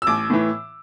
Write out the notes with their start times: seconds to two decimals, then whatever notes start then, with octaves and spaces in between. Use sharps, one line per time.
0.02 E6
0.07 A1 D6
0.30 A2 E3